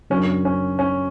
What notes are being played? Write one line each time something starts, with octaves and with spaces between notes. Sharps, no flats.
F#2 C#3 F#3 A#3 C#4 D4
C#4
C#4